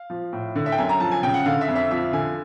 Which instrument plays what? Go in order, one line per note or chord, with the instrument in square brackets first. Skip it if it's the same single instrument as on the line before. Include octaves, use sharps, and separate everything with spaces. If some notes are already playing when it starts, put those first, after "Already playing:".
Already playing: [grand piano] F5
F3
A2
D3
E5
G5
F#2 G#5
A#5
F3 A5
G#5
C#3 G5
F#5
D3 F5
E5
F2
E5
F3 E5
D3 G#5